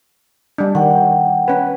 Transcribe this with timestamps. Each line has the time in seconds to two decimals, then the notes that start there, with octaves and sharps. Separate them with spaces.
0.58 G3 D4
0.75 D#3 F#5 G5
1.48 C#4 B4